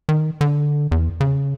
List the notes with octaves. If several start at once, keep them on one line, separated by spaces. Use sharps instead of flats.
D#3
D3
E2
C#3